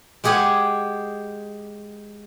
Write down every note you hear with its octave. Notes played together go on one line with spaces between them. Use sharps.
G#3 G4 G#4 F#5 G#5